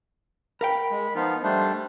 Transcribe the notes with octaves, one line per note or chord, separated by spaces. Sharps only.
A#4 F5 G5 B5
G#3
F3 B3 D#4 F4
G3 A3 D4 C5